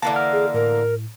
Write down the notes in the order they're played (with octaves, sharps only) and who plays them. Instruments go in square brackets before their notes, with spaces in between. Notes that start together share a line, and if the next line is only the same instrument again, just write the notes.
[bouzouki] D3 E3 A#3 [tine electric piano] A5
[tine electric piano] F6
[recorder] G#4
[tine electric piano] A2 [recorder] A#4